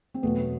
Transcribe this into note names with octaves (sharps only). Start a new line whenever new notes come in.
C4
E2 B2 F#3 A3 B3